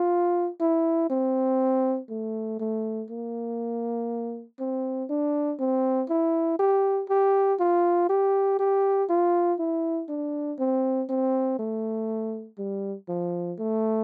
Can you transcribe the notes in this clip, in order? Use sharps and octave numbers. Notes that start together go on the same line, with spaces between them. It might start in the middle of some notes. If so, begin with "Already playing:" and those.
Already playing: F4
E4
C4
A3
A3
A#3
C4
D4
C4
E4
G4
G4
F4
G4
G4
F4
E4
D4
C4
C4
A3
G3
F3
A3